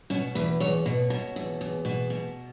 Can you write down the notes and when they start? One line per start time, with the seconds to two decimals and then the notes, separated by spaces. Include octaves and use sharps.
0.10 B2 C#4
0.35 E2 B4
0.60 E2 C#5
0.86 B2 C#5
1.10 B2
1.36 E2
1.61 E2
1.85 B2
2.10 B2